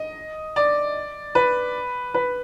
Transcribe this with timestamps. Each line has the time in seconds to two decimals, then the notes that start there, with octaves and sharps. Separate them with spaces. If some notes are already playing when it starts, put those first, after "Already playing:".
Already playing: D#5
0.56 D5
1.35 B4
2.14 B4